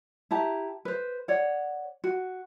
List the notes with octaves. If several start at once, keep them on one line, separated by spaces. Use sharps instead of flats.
E4 G4 A5 A#5
B4 C5
C#5 D5 F#5
F#4